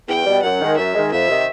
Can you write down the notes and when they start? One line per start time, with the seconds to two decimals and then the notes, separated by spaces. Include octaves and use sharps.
0.08 E2 G5
0.25 B2 G3
0.43 F#2 F#5
0.61 D#3 G#3
0.77 F#2 E5
0.95 D#3 G#3
1.12 F2 E5
1.29 C3 D#3